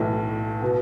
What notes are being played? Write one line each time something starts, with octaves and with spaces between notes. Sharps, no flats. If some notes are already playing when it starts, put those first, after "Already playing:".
Already playing: B1 A2 E3
B2 B3